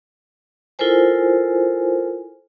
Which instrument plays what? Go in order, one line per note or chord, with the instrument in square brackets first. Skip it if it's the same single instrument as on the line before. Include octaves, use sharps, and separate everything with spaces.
[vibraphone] E4 F4 A4 A#4 C5 G#5